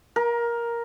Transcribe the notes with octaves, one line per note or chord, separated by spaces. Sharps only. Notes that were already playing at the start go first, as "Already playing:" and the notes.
A#4